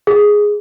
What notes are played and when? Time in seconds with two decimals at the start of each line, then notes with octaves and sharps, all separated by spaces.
0.07 G#4